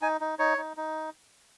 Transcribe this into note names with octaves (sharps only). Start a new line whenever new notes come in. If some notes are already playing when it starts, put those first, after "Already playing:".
D#4 G#5
D#4
D#4 C#5
D#4
D#4